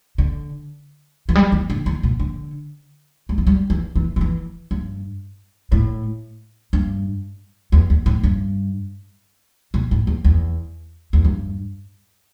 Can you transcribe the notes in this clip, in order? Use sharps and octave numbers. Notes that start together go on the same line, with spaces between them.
D3
E3
G3
E3
D3
E3
B2
D3
G3
E3
G3
E3
E3
D3
E3
G2
A2
G2
E2
E2
A2
G2
B2
A2
E2
E2
E2
G2